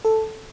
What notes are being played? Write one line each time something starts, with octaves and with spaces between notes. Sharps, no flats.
A4